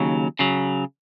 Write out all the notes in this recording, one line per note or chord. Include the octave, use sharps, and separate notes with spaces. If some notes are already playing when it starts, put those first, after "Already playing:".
Already playing: D#2 C#3 F#3
C#3 F#3